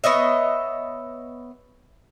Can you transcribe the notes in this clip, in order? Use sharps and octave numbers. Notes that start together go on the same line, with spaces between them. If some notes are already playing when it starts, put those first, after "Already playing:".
B3 C#5 D#5 E5